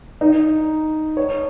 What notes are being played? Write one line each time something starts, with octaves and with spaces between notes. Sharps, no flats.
D#4
C#5